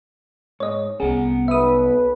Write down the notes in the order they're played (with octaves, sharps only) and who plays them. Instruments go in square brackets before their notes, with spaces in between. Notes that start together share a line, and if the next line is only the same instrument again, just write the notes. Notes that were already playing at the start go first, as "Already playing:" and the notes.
[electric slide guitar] G#2 [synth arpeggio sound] C#5 D#5
[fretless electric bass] C2 C#4 [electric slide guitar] B3 F#5 A#5 [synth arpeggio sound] G#4
[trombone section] B1 B4 [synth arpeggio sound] E5 D#6